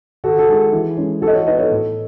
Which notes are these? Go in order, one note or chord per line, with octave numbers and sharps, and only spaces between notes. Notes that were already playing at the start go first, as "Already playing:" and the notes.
D#3 F#4 A4
A4
G#3 D#4 G#4
E3
G#3 C#4 E4
E3 F#4 A4
D#5
A4 C#5
B3 D#4 B4 D#5
A4 C#5
A2